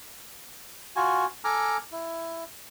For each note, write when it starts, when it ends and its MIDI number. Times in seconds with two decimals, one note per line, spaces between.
0.96 1.26 65
0.96 1.26 66
0.96 1.26 80
1.44 1.77 69
1.44 1.77 80
1.44 1.77 82
1.44 1.77 86
1.44 1.77 89
1.92 2.44 64